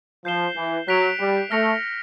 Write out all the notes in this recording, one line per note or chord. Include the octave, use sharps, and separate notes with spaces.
F3 G6 C7 E7 G7
E3
F#3 F#6 B6 D7 F7
G3
A3 F6 A#6 C#7 F7